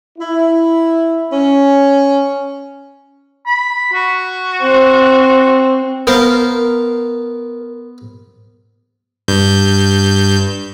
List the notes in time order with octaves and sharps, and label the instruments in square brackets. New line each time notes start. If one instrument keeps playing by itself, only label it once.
[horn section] E4
C#4
[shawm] B5
F#4
[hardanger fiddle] C4
[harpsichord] B3 C5 F5 [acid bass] A#4
[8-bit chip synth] G2 G6